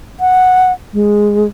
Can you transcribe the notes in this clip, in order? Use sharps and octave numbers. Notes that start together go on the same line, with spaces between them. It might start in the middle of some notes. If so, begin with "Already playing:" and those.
F#5
G#3